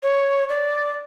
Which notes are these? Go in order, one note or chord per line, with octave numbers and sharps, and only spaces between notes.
C#5
D5